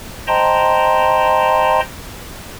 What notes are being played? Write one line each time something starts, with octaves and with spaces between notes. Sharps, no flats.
C5 D#5 G5 A5 A#5 C6